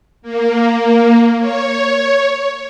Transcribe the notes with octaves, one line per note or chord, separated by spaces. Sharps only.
A#3
C#5